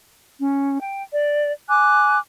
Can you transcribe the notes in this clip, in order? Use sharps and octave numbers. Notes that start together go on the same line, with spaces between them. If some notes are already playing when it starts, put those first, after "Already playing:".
C#4
G5
D5
G#5 D6 F#6